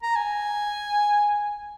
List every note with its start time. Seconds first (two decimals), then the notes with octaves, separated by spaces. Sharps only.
0.03 A#5
0.16 G#5